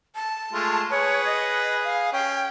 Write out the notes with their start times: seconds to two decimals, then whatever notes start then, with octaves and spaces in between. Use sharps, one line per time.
0.15 A5
0.52 G#3 A3 F4
0.91 G#4 B4 C#5
1.25 D#5
1.84 F5
2.13 C#4 G5